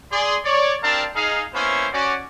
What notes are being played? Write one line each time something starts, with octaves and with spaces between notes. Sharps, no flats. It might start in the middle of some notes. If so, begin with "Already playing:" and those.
G#4 D5 C6
C#5 D5
C4 D4 G4 A#4 F5 A5
D#4 G#4 F5
A#3 B3 C#4 E4 C5
C#4 F#4 D5